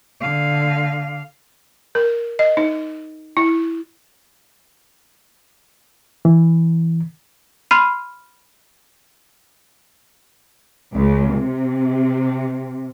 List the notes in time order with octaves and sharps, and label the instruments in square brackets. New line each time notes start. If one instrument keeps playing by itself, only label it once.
[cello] D3 F5
[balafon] A#4
D#5
D#4
E4
[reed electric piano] E3
[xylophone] B5 C6 F6 C7 D#7
[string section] C#2
C3